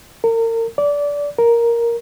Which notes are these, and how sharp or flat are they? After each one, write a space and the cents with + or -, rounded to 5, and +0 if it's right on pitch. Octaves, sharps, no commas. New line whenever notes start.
A#4 -35
D5 -20
A#4 +5